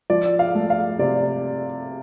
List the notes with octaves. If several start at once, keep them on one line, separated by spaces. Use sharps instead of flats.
F3 D5
F5
A3
F5
C3 D5